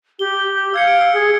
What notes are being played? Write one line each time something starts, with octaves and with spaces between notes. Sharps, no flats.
G4 G7
F5 E6 G#6 C#7
D7
E6
G#4